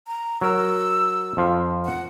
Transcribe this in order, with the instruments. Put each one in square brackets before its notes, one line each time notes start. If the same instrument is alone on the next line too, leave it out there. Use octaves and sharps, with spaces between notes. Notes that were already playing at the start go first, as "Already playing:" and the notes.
[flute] A#5
[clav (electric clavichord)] F#3 A#4 A#5 [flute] E6
[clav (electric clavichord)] F2 F3 F5
[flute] F#5